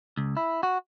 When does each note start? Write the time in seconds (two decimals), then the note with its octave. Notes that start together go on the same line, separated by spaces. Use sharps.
0.17 C#2
0.37 E4
0.63 F#4